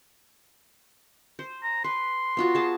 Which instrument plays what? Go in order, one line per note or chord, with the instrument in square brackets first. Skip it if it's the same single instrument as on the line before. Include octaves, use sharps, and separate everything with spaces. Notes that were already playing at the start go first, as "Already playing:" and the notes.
[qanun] C5
[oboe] A#5
[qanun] B4 [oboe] C6
[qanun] B3 F4 F#4
G#4 A5